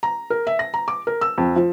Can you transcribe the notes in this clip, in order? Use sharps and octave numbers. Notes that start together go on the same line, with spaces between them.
A#5
A#4
E5
A#6
A#5
D6
A#4
E6
F2
F3